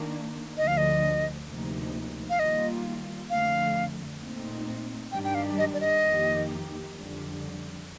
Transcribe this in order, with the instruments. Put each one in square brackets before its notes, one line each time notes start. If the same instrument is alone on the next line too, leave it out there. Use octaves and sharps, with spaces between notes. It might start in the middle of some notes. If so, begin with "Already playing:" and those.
Already playing: [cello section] D#3 A#3 D4
[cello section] D2 D3 F3 [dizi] D#5
[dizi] F5
D#5
[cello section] D2 C3 F3 A#3 D#4
[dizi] F5
[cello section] D#3 G3 A#3 F4 [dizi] D#5
[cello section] F2 D3 A3 [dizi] F5
[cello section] A#2 A3 C4 D#4
[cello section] G2 D#3 G3 D4 G4 [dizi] G5
[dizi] G5
F5
D#5
D5
D#5
[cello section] F2 D#3 A#3 D#4 G4
F2 D3 G3